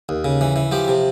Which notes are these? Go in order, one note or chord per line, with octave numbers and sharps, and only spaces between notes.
D#2
C#3
E3
E3
F3 G4
C3